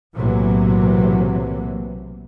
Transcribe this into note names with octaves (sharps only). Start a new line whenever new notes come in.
B1 A2 C3 E3 F#3 A#3